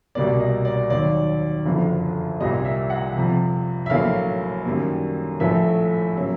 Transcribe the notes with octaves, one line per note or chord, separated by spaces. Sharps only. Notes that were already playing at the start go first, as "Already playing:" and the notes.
C2 B2 G3 A#3 D5
D#5
D5
D#2 D#3 F#3 D5
F#1 F2 D3 F3
C2 A#2 G3 D#5
E5
F#5
F2 C3 F3
E5
A#1 A2 F#3 A#3 F5
F#2 D#3 G3 A#3
A#1 A2 F3 A3 E5
C#3 F#3 A#3